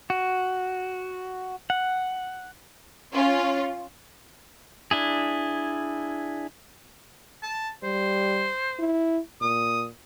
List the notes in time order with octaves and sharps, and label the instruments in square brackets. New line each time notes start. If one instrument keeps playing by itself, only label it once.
[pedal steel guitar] F#4
F#5
[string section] C#4 F4
[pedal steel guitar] D4 E4 G#4
[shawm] A5
[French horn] G3 [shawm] C5
[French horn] E4
[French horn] A#2 [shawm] D#6